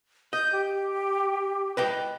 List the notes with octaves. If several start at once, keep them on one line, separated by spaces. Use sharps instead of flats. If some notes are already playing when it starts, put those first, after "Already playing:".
D#5 G6
G4
B4 D#5 G5